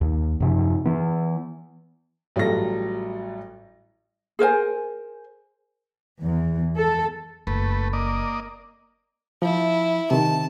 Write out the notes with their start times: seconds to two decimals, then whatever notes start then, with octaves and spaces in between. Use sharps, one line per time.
0.01 D#2
0.40 F#2 C3 F3
0.85 E3 B3
2.36 A1 F#3 G3 F4 A4 A#6
4.39 G#4 A#4 C5 G#5
6.22 E2
6.76 A4
7.47 F#1 A3 B4
7.93 A#3 D5 D#5
9.42 F3 E4
10.11 C3 D#3 A5